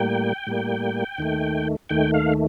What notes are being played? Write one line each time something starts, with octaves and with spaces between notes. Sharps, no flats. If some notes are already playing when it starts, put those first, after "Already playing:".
Already playing: A2 G3 A#3 G5
A2 G3 A#3
D#2 D#3 A3
D#2 D#3 A3 G5
F5